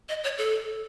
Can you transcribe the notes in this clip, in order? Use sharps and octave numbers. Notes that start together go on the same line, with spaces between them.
D#5
C#5
A4